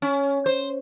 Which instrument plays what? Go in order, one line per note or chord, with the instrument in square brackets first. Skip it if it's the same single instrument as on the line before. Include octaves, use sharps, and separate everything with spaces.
[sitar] C#4
C5